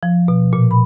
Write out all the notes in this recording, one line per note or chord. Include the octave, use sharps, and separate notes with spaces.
F3
B2
A#2
B5